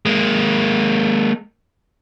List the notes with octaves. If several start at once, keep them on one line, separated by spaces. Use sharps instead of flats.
G#3 A#3